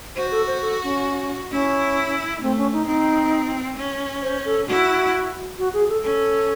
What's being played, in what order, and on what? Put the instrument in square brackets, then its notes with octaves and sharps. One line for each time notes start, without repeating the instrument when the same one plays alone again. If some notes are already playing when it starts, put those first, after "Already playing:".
[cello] F#4 [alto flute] C5
[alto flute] A4
C5
A4
C#4
[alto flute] C#4 [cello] E4
[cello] A3 [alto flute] C4
[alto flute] C#4
D#4
[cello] C4 [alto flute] D#4
[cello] C#4
[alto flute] C5
A4
[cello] E4 [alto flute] F#4
[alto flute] F#4
G#4
A4
[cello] C#4 [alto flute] A4